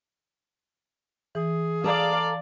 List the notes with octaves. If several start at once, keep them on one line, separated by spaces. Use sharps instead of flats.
E3 G#4
A4 D5 F5 A#5